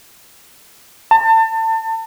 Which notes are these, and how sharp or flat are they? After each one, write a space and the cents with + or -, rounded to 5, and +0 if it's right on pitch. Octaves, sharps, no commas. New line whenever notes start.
A5 +30